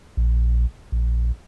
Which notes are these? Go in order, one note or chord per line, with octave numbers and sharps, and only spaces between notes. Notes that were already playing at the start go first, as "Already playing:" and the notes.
A#1
A#1